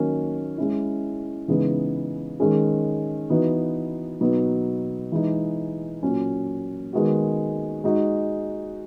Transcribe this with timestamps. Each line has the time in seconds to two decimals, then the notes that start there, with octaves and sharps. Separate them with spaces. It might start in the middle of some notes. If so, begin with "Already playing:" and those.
Already playing: D#3 F#3 A#3 C#4
0.58 G#3 C#4 E4
1.48 C#3 E3 G#3 B3 D#4
2.40 D#3 G#3 C#4 G#4
3.30 E3 B3 D#4 F#4
4.21 B2 F#3 B3 D#4
5.12 E3 G#3 D#4
6.03 A#2 F#3 C#4
6.93 D#3 G#3 B3 F#4
7.84 G#3 D#4 F#4